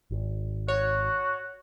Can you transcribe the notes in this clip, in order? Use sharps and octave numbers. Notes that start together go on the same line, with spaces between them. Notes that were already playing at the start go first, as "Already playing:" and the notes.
G#1
F#4 C#5